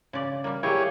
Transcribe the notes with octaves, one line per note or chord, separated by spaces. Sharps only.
C#3 D5
G3 A#3
A#3 E4 G4 G#4 C#5